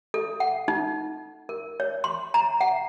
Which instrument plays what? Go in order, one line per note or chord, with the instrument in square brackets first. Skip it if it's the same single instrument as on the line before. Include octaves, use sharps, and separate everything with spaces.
[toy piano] A4
F#5
D#4
A#4
C#5
C6
A#5
F#5